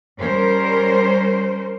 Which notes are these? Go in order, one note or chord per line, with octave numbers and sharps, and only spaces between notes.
G3 C#4 A#4 C5